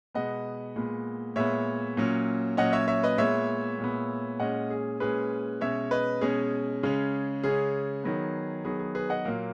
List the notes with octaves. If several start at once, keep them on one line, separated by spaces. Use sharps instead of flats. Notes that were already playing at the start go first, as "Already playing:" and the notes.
B2 G#3 B3 D#5 F#5
A#2 G#3 B3
A#2 G#3 B3 C#5 E5
A#2 F#3 C#4
A#2 F#3 C#4 D#5 F#5
C#5 E5
C#5 E5
B4 D#5
A#2 G#3 B3 C#5 E5
A#2 G#3 B3
A#2 G#3 C#4 D#5 F#5
G#4
A#2 G#3 C#4 G#4 B4
B2 G#3 C#4 C#5 E5
B4 D#5
B2 G#3 C#4 G#4
C#3 G#3 C#4
C#3 G#3 C#4 G#4
D#3 F#3 B3
D#3 F#3 B3 G#4
G#4
G#4 B4
D#5 F#5
A#2 F#3 A#3